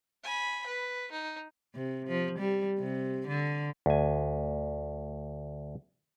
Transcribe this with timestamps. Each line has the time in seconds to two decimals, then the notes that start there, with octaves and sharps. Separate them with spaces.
0.24 G#5 B5
0.67 B4
1.11 D#4
1.74 C3
2.08 F3
2.39 G3
2.79 C3
3.28 D3
3.86 D2 G#5